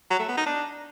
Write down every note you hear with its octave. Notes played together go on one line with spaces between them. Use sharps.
F#3
A3
B3
D#4
D4